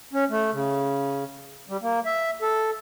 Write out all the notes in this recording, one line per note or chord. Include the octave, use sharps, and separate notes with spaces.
C#4
A3
C#3
G3
A#3
E5
A4